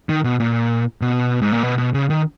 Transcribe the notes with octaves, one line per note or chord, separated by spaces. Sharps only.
D#3
B2
A#2
B2
G#2
A#2
B2
B2
C#3
D#3